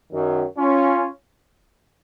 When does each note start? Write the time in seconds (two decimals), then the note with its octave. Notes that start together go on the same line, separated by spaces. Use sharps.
0.12 F#2 D#3 F#3
0.57 C#4 F4